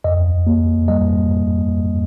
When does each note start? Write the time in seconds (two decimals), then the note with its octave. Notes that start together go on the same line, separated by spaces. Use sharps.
0.04 F2 D#5
0.47 A#3
0.88 G3 D#5